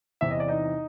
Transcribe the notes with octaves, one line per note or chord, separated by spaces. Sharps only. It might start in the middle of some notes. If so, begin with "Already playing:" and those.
E2 C3 E3 E5
D#5
D5
D#4 D#5